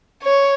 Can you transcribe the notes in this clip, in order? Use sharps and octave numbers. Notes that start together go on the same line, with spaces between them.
C#5